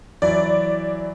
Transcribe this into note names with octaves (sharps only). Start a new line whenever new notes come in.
E3 F#3 E4 D5